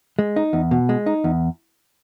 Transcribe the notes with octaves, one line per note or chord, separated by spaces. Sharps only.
G#3
D#4
E2
B2
G#3
D#4
E2